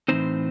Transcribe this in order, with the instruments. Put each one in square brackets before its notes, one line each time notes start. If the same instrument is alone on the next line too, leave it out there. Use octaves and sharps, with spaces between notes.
[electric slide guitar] A2 E3 G3 C4 D#4 C5